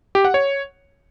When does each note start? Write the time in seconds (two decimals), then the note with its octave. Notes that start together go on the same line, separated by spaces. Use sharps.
0.15 G4
0.25 F#5
0.34 C#5